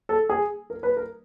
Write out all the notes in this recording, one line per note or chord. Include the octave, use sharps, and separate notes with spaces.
A4
G#4
A#4
B4
A#4